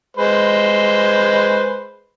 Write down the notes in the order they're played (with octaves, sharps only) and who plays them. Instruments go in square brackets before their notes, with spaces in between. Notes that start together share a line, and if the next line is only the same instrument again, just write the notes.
[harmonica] G#3 B4 C5